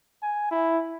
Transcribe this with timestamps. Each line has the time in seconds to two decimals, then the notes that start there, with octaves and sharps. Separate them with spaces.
0.23 G#5
0.51 E4